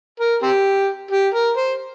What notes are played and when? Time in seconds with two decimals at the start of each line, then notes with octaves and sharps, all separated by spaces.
0.20 A#4
0.43 C4 G4
1.11 G4
1.34 A#4
1.57 C5